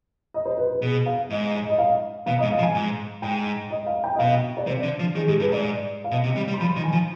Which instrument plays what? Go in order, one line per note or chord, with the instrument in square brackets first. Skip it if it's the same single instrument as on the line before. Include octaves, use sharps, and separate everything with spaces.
[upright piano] D#5
C5
B4
B4
[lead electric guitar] B2 [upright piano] G#4
[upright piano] F5
[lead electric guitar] G#2 [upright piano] D#5
[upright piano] D#5
D#5
F5
[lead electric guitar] B2 [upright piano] F5
[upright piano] D#5
[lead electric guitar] G#2
[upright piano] F5
[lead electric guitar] F3
[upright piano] G#5
[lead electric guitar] G#2
[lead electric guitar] G#2 [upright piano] G5
[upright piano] D#5
F5
G5
D#5
[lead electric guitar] B2 [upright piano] F5
[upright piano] D5
[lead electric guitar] C3 [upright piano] C5
[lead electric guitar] D3
F3
[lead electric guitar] D#3 [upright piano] G#4
[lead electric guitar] G#2 [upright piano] G4
[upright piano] G#4
[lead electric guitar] G2 [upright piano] B4
[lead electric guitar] G#2 [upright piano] D5
[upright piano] F5
[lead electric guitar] B2 [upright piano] D#5
[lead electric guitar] C3
G3
G3
[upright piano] C6
[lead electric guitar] F3 [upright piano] B5
[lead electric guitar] D#3
[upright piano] G#5
[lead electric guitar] F3